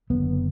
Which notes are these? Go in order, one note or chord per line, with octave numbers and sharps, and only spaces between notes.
F#1 F#2 D3 B3